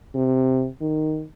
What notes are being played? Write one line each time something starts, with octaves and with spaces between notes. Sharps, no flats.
C3
D#3